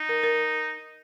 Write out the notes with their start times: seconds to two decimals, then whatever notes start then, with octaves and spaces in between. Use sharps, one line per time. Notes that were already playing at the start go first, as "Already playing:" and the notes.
Already playing: D#4
0.09 A#4
0.24 A#4